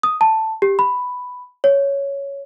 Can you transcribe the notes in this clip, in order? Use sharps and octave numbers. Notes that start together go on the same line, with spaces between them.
D#6
A5
G4
B5
C#5